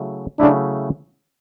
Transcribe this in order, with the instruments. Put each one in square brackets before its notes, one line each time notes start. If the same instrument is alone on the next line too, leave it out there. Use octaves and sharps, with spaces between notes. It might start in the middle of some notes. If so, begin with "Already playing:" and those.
Already playing: [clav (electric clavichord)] C#3 F#3 A3 E4
[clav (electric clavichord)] C#3 F#3 A3 E4 [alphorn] D4